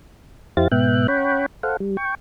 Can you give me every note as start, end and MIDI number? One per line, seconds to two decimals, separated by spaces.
0.57 0.68 41
0.57 0.68 64
0.57 0.68 67
0.57 0.68 72
0.57 0.68 77
0.57 0.68 93
0.72 1.07 44
0.72 1.07 47
0.72 1.07 59
0.72 1.07 76
0.72 1.07 79
0.72 1.07 90
1.08 1.46 61
1.08 1.46 73
1.08 1.46 78
1.08 1.46 79
1.08 1.46 83
1.63 1.77 69
1.63 1.77 72
1.63 1.77 77
1.63 1.77 78
1.80 1.97 55
1.97 2.15 79
1.97 2.15 85